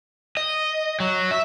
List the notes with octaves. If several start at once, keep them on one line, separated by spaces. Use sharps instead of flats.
D#5
F#3
E5